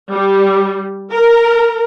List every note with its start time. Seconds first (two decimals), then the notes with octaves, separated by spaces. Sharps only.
0.11 G3
1.12 A#4